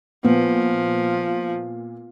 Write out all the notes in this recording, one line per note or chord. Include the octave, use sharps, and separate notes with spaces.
A#2 F3 B3